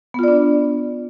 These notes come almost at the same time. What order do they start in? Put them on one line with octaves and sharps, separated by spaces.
B3 F4 D5 D4